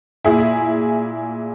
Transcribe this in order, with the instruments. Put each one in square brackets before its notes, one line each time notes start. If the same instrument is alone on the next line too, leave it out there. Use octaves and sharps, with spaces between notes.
[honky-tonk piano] A#2 E4 G#4